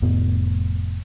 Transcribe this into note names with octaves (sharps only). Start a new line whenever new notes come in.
F1 F2 A2 B3